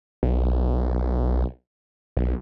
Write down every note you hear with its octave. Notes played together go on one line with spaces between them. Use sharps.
B1
B1